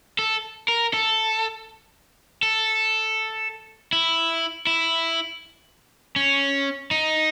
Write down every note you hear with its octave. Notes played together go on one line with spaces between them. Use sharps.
A4
A#4
A4
A4
E4
E4
C#4
D#4